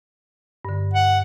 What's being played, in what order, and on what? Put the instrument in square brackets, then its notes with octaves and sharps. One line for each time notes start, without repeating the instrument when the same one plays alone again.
[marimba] G2 D3
[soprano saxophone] F#5